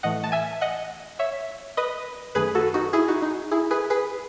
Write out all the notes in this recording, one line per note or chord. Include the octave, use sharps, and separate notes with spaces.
A2 E3 A3 D#5 F#5
A5
E5 G#5
D#5 F#5
C#5 E5
B4 D#5
F#2 D#3 A3 G#4 B4
F#4 A4
D#4 F#4
E4 G#4
D#4 F#4
D#4
E4 G#4
G#4 B4
G#4 B4